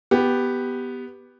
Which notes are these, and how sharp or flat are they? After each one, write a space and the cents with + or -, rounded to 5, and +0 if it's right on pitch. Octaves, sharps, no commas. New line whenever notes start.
B3 +0 G4 +0